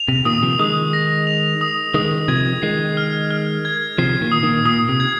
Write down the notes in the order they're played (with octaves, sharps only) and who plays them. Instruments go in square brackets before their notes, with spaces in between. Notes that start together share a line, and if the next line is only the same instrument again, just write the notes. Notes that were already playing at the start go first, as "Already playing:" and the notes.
Already playing: [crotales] F7
[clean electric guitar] C3
[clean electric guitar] A#2 D#3 [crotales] D#6
[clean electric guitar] C3 F3
[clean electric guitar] D#3 G#3 [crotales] D#6
[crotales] A#6
F7
D#6
[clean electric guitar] D#3 G#3 [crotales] D#6
[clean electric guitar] C3 F3 [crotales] G#6
[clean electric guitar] D#3 G#3 [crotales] C7
[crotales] F6
F6
G#6
[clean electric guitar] C3 F3 [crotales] C7
[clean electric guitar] A#2 D#3
[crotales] D#6
[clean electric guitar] A#2 D#3
[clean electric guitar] A#2 [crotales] D#6
[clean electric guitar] C3
[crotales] G#6